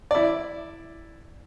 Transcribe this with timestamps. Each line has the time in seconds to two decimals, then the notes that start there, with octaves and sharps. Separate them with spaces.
0.11 E4 D5